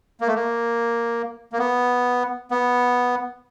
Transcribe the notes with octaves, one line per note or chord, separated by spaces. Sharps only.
A#3
A3
A#3
A#3
B3
B3